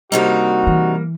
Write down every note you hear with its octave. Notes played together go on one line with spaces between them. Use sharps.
G2 C3 G3 A#3 D#4 F#4
E3